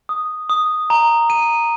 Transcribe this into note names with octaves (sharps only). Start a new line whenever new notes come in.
D#6
D#6
A#5
D#7